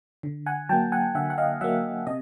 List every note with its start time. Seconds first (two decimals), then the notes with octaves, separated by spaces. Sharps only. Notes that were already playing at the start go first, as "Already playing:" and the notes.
0.23 D3
0.46 F#5 G#5
0.69 F#3 G5 A5
0.73 A#3
0.92 F#5 G#5
1.15 D3 E5 F#5
1.30 F#5
1.38 D#5 F5
1.61 F#3 E5 F#5
1.64 A#3
2.07 C3 D#5